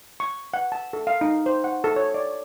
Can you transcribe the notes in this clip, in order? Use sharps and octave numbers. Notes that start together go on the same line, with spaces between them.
C#6
F#5
A5
A4
F5
D#4
C5
F#5
A4
C#5
D5